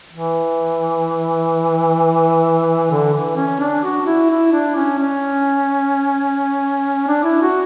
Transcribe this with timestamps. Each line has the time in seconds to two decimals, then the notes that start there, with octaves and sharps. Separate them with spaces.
0.13 E3
2.91 D3
3.14 E3
3.36 C#4
3.60 D4
3.84 F#4
4.06 E4
4.30 E4
4.53 D4
4.75 C#4
4.98 C#4
7.08 D4
7.24 E4
7.42 F#4